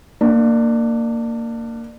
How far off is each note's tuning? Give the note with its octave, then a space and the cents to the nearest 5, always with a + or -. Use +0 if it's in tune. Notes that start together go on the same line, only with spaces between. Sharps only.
A#3 -15 D4 +25